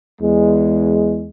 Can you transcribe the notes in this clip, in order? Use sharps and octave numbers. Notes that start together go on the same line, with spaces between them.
E2 G#3